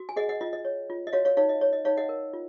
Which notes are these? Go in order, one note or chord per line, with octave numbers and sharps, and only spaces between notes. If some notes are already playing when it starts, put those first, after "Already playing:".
Already playing: F#4
G#5
G#4 D#5 F#5
D#5 F#5
F4 D#5
D#5
C#5
F4
D#5
F#4 C#5 F5
C#5 F5
D#4 C#5 F5
D#5
C#5
D#5
D#4 C#5 F5
D#5 F#5
A#4
F4